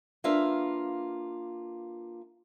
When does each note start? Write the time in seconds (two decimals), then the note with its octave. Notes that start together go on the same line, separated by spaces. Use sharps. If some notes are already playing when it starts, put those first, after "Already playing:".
0.24 A#3 D4 F4 B4 E5 F5